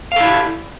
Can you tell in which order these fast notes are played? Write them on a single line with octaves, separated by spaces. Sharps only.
F5 A4 E4 G4